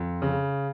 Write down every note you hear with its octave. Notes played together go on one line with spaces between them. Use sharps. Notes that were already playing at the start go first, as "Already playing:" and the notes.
Already playing: F2
C#3